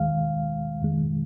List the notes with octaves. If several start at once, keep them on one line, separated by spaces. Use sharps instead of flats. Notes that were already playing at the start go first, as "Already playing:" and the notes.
Already playing: D#2 D#3 G#3 F5
F2 D#3 G#3